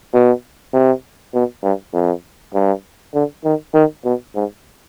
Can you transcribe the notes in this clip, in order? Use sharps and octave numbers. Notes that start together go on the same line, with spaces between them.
B2
C3
B2
G2
F2
G2
D3
D#3
D#3
B2
G#2